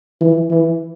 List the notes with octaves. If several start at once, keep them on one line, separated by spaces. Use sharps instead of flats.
E3
E3